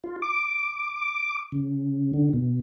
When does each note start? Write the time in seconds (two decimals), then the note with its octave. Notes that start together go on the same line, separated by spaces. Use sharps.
0.04 F4
0.22 D6
1.52 C#3
2.13 D3
2.33 B2